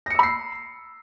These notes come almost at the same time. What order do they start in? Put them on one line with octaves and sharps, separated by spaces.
A#6 C#7 E6 B5 C7